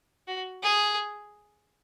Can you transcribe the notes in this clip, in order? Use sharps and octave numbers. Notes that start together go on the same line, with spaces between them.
F#4
G#4